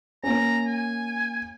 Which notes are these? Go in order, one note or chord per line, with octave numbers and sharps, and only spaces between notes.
A#3 C#4 A#5
G#5